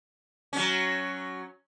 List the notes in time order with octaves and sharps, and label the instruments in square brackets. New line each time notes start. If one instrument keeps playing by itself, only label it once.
[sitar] F#3 C#4